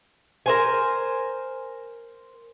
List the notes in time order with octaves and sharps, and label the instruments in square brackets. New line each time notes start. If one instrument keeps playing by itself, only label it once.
[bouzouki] A#4 C5 G#5